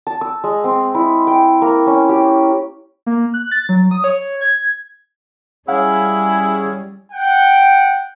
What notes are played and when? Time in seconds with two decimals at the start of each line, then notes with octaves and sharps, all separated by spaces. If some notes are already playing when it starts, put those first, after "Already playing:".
0.07 A5
0.21 E6
0.44 G#3
0.64 C4
0.95 E4
1.27 G5
1.62 A#3
1.87 C#4
2.09 G4
3.06 A#3
3.34 F#6
3.52 A6
3.69 F#3
3.91 D#6
4.04 C#5
4.41 G#6
5.68 G3 C#4 E4 G#4 C#5 F5 F#5
7.13 F#5 G5